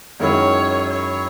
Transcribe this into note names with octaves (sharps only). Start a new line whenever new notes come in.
F#2 D#3 G#3 C#4 E4 C#5
C#5